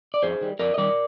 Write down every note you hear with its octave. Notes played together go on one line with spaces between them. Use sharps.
D5
F2 G#4 C5
D#3 G3
F2 A#4 D5
D#5
D#3 G3 A#4 D5